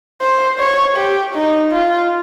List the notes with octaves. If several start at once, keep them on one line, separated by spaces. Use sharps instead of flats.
C5
C#5
G4
D#4
F4